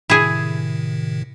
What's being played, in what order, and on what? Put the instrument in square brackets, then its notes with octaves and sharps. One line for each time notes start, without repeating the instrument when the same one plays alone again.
[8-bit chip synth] A2 C3 D#3 [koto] E4 G#4